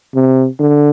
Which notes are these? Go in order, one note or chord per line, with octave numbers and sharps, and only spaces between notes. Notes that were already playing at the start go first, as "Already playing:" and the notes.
C3
D3